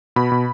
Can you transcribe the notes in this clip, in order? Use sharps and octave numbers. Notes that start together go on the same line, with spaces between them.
B2 B5
B2